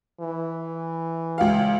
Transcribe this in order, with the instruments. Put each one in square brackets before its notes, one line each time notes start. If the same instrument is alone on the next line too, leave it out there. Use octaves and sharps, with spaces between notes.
[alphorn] E3
[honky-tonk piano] C#2 F5